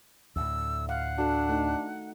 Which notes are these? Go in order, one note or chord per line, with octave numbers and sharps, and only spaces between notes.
D2 A2 E6
F5 F#5
D4 F#4 A4
A3 D#4